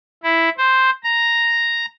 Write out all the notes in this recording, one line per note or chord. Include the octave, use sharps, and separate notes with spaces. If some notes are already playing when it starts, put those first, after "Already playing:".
E4
C5
A#5